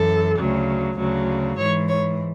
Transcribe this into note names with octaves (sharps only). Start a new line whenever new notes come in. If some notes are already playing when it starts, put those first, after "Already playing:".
Already playing: F#2 E3 A4
D2 C#3 F#3
D2 C#3 F#3
G#2 E3 C#5
C#5